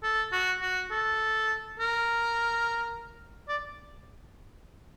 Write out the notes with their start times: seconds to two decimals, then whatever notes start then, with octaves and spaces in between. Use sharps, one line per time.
0.03 A4
0.32 F#4
0.62 F#4
0.91 A4
1.79 A#4
3.48 D5